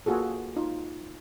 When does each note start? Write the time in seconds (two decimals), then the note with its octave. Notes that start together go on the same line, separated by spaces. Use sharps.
0.06 A#3 F4 F#4 G#4 A4
0.56 D#4 F4